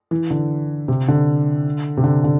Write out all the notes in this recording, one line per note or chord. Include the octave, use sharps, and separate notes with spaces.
E3
D3
C3
D3
C3
D3
D3